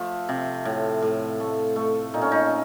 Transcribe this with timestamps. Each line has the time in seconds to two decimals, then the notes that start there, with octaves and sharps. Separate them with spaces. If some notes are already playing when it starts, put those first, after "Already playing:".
Already playing: F3 A3
0.29 C3
0.65 A2
1.02 A2
1.40 A3
1.76 A3
2.14 A#2 D#4
2.22 C#4
2.32 D#4